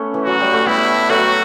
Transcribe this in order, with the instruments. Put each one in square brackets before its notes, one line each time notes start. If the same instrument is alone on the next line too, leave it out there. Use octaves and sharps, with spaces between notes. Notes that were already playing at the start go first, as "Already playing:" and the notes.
Already playing: [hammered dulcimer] A3 B3 C#4
E3
[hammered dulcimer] F#3 [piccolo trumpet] F#4
[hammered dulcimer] G3
A3
[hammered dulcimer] G3 B3 [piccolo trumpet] E4
[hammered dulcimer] F#3 A3 [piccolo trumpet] F#4